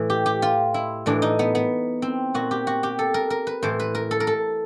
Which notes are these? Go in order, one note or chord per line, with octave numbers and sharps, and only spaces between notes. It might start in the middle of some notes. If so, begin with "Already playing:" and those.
Already playing: A2 E3
G4
G4
F4
E4
A2 E3 D4
D#4
B3
B3
C4
A#2 F#4
G4
F#4
G4
A4
A#4
A#4
B4
A2 E3 C5
B4
A#4
A4
A#4
A4